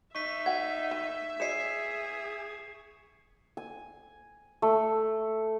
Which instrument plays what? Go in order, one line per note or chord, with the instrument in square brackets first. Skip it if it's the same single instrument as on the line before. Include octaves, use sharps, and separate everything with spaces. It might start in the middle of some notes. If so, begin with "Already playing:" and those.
[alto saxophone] D#4 [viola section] E5 [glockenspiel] C#6 B6
[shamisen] F#5 G5 [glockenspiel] G#6
[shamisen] D#3
[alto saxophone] G#4 [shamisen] C#5 D#5 [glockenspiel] C7 C#7 E7
[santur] G#5
A3